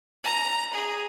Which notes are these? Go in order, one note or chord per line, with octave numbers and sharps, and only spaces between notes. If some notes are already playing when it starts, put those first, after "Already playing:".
A#5
G#4